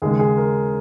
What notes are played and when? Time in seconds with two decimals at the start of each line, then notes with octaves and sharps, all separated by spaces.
0.02 D#2 C#3 G#3 G#4
0.19 G#4
0.37 A#4